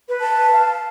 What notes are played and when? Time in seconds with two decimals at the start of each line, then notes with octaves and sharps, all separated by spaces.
0.08 B4
0.21 A5
0.52 F5